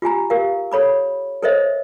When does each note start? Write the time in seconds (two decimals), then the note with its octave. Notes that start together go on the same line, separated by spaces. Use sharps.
0.02 F4 G4 G#5 A#5
0.30 G4 A#4 F5
0.72 A4 C#5 B5 D6
1.43 A4 A#4 C5 C#5 D#5 E5